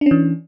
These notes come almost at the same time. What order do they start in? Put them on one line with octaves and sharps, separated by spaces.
D4 C#4 E3